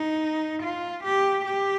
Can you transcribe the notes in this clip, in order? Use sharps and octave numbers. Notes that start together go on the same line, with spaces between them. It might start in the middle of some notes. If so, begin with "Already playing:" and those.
Already playing: D#4
F4
G4
G4